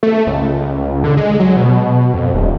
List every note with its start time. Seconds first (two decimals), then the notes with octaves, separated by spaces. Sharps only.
0.03 A3
0.27 C#2
1.04 D3
1.17 G#3
1.40 F#3
1.57 B2
2.14 F2
2.34 D#1